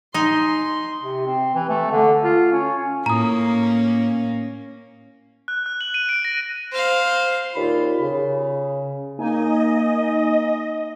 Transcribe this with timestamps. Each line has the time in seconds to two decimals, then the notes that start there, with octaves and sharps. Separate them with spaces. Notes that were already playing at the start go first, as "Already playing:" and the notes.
0.14 D#4 G#5 C6
1.01 C3
1.26 C4
1.55 E3
1.69 A3
1.91 D3
2.23 F4
2.52 C#4
3.06 A2 A#3 C#4 A#5 D#6
5.48 F#6
5.66 F#6
5.81 F#7
5.94 D#7
6.09 D7
6.25 A#6
6.73 C5 F5
7.55 D#2 A#2 F4 B5
8.01 C#3
9.18 A#3 D#4 D#5 G#5